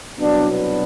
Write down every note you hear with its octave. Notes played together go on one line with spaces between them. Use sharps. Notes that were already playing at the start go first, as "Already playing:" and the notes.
C2 B2 F#3 B3 D4
B3 D4